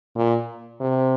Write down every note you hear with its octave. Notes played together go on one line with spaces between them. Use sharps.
A#2
C3